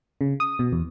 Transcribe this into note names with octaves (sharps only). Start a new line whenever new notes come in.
C#3
D#6
B2
E2